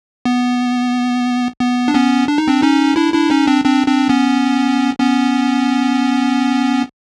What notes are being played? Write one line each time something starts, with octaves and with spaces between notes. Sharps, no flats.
B3
B3
D4
B3 C#4
D4
D#4
C4 D4
C#4 D#4
D4 E4
D4 E4
C#4 D#4
C4 D4
C4 D4
C4 D4
B3 C#4
B3 C#4